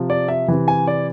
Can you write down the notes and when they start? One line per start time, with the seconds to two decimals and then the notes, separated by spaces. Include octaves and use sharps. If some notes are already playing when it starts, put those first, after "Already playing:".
Already playing: C3 F3
0.10 D5
0.28 E5
0.48 C3 E3
0.68 G#5
0.87 D5